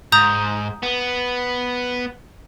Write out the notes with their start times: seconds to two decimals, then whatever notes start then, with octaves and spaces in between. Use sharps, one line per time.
0.12 G#2 A#5 D#6 G6
0.83 B3